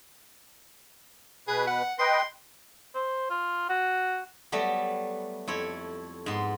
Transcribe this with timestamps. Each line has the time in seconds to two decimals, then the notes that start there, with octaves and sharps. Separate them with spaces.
1.48 B2 G#4 B4
1.67 F#5
1.99 B4 D#5 G5 C6
2.95 C5
3.30 F4
3.69 F#4
4.52 F#3 G3 A3 B3
5.48 F2 E4 C#5
6.26 G#2 B3 C6